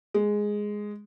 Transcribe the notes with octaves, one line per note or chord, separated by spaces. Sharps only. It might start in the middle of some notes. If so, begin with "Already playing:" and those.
G#3